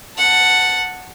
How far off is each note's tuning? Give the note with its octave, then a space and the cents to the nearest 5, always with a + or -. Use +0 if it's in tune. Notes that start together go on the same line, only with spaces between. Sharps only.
F#5 +0 A5 +10